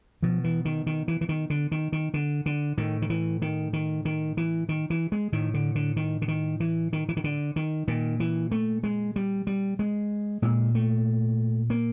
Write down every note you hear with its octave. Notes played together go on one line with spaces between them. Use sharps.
B2 F3
E3
D#3
D#3
E3
E3
D#3
D3
D#3
D#3
D3
D3
A2 D#3
D#3
E3
D#3
D#3
D#3
E3
D#3
E3
G#3
A2 D#3
D3
D3
D#3
D3
D#3
E3
D#3
E3
D#3
D3
D#3
A#2 D#3
E3
A3
G#3
G3
G3
G#3
A#2 G#3
A3
A#3